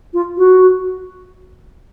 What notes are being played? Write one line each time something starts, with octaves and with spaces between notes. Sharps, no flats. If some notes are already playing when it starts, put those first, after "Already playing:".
F4
F#4